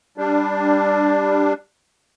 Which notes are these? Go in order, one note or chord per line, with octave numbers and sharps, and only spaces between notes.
G3 D4